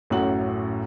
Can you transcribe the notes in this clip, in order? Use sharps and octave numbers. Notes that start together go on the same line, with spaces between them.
A1 F#2 A2 F#4 F#7